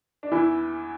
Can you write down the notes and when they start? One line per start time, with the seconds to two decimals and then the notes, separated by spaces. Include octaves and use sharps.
0.23 D4
0.32 E2 E3 E4